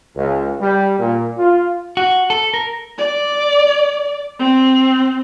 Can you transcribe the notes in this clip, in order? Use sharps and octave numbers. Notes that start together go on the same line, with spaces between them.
C#2
G3
A#2
F4
F#4
A4
A#4
D5
C4